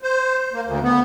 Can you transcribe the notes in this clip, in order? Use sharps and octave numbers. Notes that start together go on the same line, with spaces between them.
C5
A#3
D2
B3